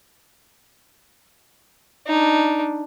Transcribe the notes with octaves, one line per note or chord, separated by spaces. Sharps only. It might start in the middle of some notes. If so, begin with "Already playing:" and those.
D4 D#4